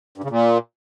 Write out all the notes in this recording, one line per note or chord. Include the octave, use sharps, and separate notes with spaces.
G2
C#3
A#2